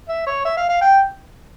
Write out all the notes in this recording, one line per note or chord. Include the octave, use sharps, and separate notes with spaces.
E5
C#5
E5
F5
F5
G5